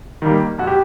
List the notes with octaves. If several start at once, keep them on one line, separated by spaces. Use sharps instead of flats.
D#3 G3 A#3
F2 F#4
G4